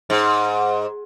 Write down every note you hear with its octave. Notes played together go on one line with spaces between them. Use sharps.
G#2